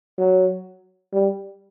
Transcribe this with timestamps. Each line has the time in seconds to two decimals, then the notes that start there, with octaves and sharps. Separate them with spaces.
0.18 F#3
1.13 G3